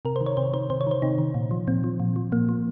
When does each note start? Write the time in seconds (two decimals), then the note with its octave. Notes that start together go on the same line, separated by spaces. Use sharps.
0.05 C3 A#4
0.16 C5
0.21 D#3
0.26 C#5
0.37 C3 C5
0.53 D#3 C5
0.70 C3 C5
0.81 C#5
0.87 D#3 C5
1.02 C3 D#4
1.18 D#3
1.34 A#2
1.51 F3
1.67 A#2 C4
1.84 F3
2.00 A#2
2.16 F3
2.32 A#2 A#3
2.49 F3